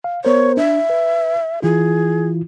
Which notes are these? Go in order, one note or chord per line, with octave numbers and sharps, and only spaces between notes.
F5
B3 A#4 C5 C#5
D4 E5
B4
E3 E4 F4 G#4